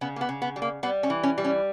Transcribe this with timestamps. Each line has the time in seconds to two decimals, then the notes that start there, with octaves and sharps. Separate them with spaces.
0.01 C#3 B3
0.16 A#3
0.21 B3
0.29 C#3
0.42 B3
0.56 G3
0.62 A#3
0.83 G3 B3
1.03 C#4
1.10 E3
1.23 C#4
1.38 G3
1.44 C#4